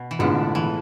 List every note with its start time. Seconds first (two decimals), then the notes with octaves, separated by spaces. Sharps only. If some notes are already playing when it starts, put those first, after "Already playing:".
Already playing: B2
0.11 E3
0.19 A1 A2 D3 G#3 B3 F4
0.55 E3